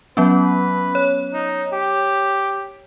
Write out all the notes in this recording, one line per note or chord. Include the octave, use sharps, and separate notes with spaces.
F#3 B3 C#4 B4
C#5
D#4
G4